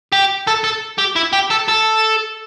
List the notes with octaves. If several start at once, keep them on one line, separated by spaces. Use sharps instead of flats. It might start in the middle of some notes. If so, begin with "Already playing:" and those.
G4
A4
A4
G4
E4
G4
A4
A4